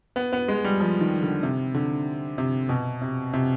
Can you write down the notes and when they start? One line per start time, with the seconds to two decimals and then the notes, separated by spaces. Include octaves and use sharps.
0.16 B3
0.33 B3
0.48 G#3
0.64 G3
0.80 F3
1.01 D#3
1.23 D3
1.43 C3
1.74 D3
2.38 C3
2.69 B2
3.01 C3
3.33 C3